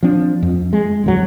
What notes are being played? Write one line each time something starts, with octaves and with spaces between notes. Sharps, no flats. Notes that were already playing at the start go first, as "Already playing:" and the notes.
F3 C4 D4
F2
G#3
D1 F2 F#3